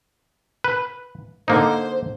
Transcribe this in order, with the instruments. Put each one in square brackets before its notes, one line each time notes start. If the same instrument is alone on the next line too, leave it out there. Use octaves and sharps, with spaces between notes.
[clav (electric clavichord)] B4
[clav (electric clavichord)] D3 A#3 D#4 [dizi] C5